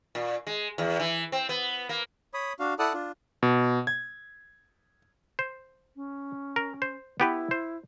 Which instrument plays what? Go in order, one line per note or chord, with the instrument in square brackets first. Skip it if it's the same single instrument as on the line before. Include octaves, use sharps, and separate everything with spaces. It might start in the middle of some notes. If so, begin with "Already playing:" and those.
[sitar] A#2
G#3
E2
E3
C4
B3
A#3
[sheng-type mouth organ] C#5 B5 D#6
D4 F#4 F5
E4 A4 D5 F#5 A5 D#6
D4 F4
[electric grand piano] B2
G#6
[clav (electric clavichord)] C5
[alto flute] C#4
[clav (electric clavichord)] A#4
C5
[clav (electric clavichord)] B3 G4 B4 [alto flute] E4
[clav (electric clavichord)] C5